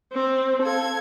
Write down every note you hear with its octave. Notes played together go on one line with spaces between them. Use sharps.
C4
A4 F5 G#6